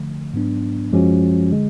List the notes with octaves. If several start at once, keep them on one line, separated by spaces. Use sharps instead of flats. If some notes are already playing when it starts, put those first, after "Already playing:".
Already playing: D3 F3 A3
G#2 F#3 B3 D4
F#2 F3 G#3 C#4 F#4
D3 G#3